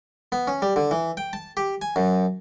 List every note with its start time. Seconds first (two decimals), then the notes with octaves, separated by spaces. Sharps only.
0.32 B3
0.47 C#4
0.62 G3
0.76 D3
0.91 E3
1.17 G5
1.33 A5
1.57 G4
1.82 G#5
1.96 F#2